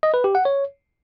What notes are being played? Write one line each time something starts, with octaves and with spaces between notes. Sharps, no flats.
D#5
B4
G4
F#5
C#5